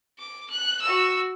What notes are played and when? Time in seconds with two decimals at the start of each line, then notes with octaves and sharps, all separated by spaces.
0.19 D6
0.50 F#6
0.81 F#4 E6